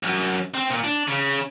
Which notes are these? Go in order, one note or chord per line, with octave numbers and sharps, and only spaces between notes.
C#2 F#2
C4
A#2
D4
C#3